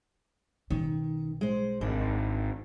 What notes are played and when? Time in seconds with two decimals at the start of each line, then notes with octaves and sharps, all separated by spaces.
0.70 B1 D#3 C#4
1.41 G#3 C5
1.81 G#1 D4